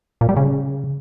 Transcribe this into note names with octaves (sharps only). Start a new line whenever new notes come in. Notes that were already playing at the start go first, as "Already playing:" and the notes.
A#2
G3
C#3